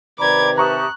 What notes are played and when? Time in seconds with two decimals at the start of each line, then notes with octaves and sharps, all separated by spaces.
0.19 C3 D#3 B4 D5 A#5 B5 D6 G#6
0.58 G4 E5 A5 A#5 C#6 D#6 F#6